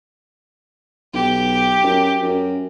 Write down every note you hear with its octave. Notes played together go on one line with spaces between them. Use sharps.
B1 G4
F#2
F#2